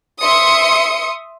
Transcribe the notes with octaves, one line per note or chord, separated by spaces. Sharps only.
E5 C6 D#6 C#7